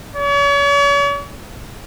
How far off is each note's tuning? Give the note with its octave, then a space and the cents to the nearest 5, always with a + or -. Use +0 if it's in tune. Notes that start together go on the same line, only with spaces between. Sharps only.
C#5 +40